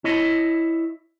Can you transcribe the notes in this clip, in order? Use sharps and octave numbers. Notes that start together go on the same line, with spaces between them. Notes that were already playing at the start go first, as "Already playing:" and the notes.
E4 C#5 D#5